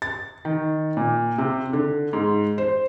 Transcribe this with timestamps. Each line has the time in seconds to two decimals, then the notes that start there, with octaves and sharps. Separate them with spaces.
0.02 A6
0.45 D#3
0.97 A#2
1.38 C3
1.73 D3
2.13 G#2
2.58 C5